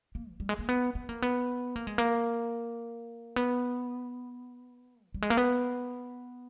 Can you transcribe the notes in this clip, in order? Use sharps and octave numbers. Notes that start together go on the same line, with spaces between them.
A#3
E3
G3
G#3
A#3
B3
B3
A#3
B3
A#3
G#3
A#3
B3
E3
G3
G#3
A#3
B3